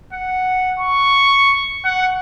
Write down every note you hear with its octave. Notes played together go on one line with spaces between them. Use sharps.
F#5
C#6
F#5